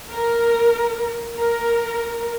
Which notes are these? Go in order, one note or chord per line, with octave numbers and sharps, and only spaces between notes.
A#4
A#4